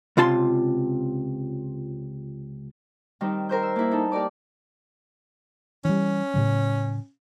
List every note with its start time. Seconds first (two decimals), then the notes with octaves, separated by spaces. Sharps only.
0.17 C#2 C3 F4 A5 C6
3.21 D#3 G3 C4 D#4
3.49 A#4 C5 G6
3.63 E6
3.76 A#3 E4
3.91 D#4 A4
4.12 G4 A#4 D5 D6
5.85 E3 G3 C#4
6.34 A2 C#3 F#3